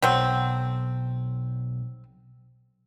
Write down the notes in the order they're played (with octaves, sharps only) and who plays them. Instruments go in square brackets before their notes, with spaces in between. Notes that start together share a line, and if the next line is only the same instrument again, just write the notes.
[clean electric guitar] B1 [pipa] F#3 C4